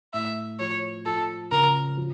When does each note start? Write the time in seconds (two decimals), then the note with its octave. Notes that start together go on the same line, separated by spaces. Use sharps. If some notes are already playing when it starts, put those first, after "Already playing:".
0.14 A2 E5
0.59 F3 C#5
1.06 F3 A4
1.51 C#3 A#4
1.97 F3